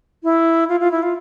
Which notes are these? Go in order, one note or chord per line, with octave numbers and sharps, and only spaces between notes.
E4
F4
F4
E4
F4